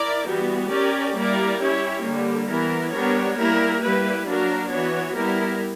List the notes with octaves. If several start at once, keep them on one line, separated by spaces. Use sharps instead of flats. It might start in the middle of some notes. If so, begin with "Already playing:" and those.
Already playing: E4 A#4 D5
E3 G3 B3 F#4
C#4 G4 A#4 D5
G3 A#3 E4 A#4 D5
C#4 E4 G4 C#5
D3 G3 A#3
E3 B3 E4 A#4
G3 B3 D4 A#4 C#5
G3 A#3 E4 A#4
G3 A#3 E4 B4
F#3 A#3 D4 F#4 A#4
E3 B3 F#4 C#5
G3 B3 E4 A#4